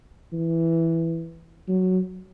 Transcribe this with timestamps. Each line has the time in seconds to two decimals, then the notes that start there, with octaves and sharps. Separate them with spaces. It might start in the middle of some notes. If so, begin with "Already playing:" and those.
0.33 E3
1.68 F#3